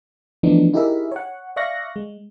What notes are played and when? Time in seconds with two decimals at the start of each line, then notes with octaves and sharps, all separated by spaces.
0.43 E3 F3 A3 B3 D4 D#4
0.73 D#4 E4 G4 G#4 A#4 E5
1.12 C#5 F#5
1.56 D5 E5 F5 C#6 F#6 A#6
1.96 G#3